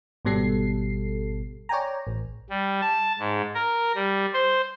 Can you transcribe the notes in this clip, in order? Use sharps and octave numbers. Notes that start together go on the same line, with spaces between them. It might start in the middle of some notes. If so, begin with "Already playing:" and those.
G#1 B2 G3 A4 C7
C#5 D5 G5 G#5 A#5
A1
G3
A5
G#2
A#4
G3
C5